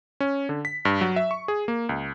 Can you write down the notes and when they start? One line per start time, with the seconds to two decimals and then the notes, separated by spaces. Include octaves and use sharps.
0.20 C#4
0.49 D3
0.65 B6
0.85 G2
1.01 F#3
1.16 E5
1.31 C#6
1.48 G#4
1.68 A#3
1.89 C#2